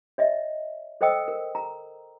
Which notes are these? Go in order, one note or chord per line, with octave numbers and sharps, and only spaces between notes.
C#5 D#5 E5
A4 C5 D#5 G5 D#6 E6
A#4
A#5